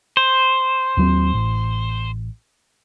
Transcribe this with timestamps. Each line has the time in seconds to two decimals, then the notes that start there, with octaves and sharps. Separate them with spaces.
0.17 C5
0.97 D#2 F#3 C4
1.34 A1